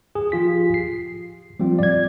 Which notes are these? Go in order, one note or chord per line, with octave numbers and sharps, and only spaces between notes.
G#4
F3 F4 G4 B6
C7
F3 G3 C4 F4
D5 G#6